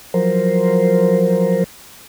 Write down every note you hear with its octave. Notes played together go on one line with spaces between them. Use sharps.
F3 F#3 A#4 C5